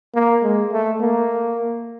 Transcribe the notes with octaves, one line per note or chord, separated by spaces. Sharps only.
A#3
G#3
A3
A#3